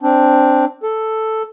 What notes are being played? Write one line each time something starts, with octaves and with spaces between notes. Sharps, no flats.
C4 D4
A4